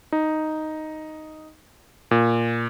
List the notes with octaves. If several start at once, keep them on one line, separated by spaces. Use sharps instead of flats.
D#4
A#2